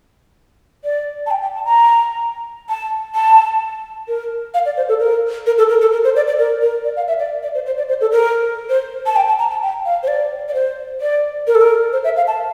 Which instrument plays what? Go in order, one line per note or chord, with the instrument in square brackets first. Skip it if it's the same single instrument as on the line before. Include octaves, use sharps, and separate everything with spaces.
[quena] D5
A5
G5
G5
A5
A#5
A5
A5
A#4
F5
D5
C5
A4
A#4
A#4
A4
A#4
A4
A#4
C5
D5
D5
A#4
A#4
D5
F5
E5
D5
D5
C5
C5
D5
C5
A4
A#4
C5
A5
G5
A5
A#5
A5
G5
F5
C5
D5
D5
C5
D5
A#4
A4
A#4
C5
E5
F5
A5